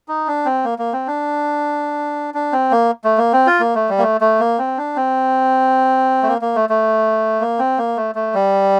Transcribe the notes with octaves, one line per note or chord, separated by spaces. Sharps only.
D#4
D4
C4
A#3
A#3
C4
D4
D4
C4
A#3
A3
A#3
C4
F4
A#3
A3
G3
A#3
A3
A3
A#3
C4
D4
C4
A3
A#3
A#3
A3
A3
A#3
C4
A#3
A3
A3
G3